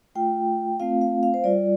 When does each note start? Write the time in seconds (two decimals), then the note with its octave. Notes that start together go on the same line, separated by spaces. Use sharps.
0.15 A3 F4 G5
0.80 A3 C4 F4 F5
1.01 F5
1.23 F5
1.34 C5
1.44 G3 F4 D5